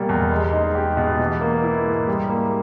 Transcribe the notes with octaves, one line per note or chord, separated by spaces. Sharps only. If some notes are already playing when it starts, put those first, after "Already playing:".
Already playing: B2 G3 A#3
E2
G#3
D#4
G4
B2
E3
A#3
E4
G#2
G3
A#3